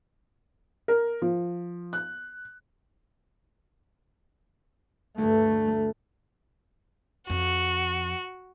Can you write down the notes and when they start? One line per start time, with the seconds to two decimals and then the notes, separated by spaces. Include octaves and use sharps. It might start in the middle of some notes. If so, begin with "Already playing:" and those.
0.88 A#4
1.22 F3
1.93 F#6
5.18 D2 G2 A3
7.30 F2 F#4